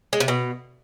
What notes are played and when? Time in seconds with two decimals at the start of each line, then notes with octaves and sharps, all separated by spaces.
0.13 G#3
0.20 C3
0.28 B2